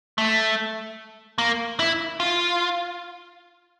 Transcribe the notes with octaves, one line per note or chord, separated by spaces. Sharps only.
A3
A#3
E4
F4